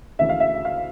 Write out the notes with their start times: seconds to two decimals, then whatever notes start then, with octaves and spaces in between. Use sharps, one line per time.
0.19 D2 C#3 E3 E5
0.29 F5
0.40 E5
0.65 F5